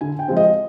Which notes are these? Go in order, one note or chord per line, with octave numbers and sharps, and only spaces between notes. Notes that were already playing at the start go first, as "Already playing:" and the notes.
D3 G#5
G5
F3 G#3 C4
D#5